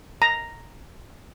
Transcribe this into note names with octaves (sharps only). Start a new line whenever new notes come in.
A#5